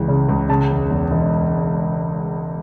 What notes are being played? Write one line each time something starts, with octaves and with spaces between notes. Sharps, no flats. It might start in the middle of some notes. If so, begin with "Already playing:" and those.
Already playing: C#2 E3
C#3
C#2
C#3 A5
E1
E2
E1